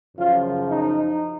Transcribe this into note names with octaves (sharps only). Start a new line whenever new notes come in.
F#2 C#3 F3 F4
D#4